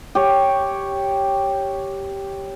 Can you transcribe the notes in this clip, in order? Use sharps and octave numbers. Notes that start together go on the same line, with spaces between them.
G4 C#5